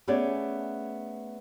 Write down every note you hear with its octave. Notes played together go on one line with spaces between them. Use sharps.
A3 B3 C#4 G#4 C#5 D5